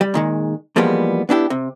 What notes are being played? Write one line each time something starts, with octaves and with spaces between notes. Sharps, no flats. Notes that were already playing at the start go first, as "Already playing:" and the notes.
G3
A#2 D#3 G#3
E2 F3 G3 G#3 A#3 B3
B3 D4 E4 G4
C3